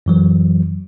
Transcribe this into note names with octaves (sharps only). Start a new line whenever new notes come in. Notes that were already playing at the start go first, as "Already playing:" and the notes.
F#2 E3 F#3